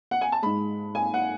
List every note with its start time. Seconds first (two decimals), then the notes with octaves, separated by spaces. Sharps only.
0.11 F#5
0.21 G#5
0.32 A5
0.42 G#2 G#3 B5
0.95 G#5
1.14 F#5